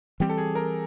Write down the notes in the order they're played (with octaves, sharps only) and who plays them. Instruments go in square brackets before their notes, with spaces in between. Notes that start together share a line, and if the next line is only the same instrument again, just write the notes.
[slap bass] E3 G3 C4 [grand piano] G4
[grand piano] A4
G#4
A#4